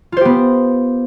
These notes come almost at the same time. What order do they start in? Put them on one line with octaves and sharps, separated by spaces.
F4 C5 G4 B3